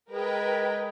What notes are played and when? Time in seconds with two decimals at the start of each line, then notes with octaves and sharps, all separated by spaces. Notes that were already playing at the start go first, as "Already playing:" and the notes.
0.11 G#3 A#4 B4 G5